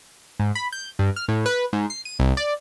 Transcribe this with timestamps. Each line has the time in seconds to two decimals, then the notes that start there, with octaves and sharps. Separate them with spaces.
0.40 G#2
0.55 B5
0.72 G6
0.99 G2
1.16 F6
1.28 A2
1.46 B4
1.73 G#2
1.90 C7
2.05 D#7
2.19 C2
2.37 D5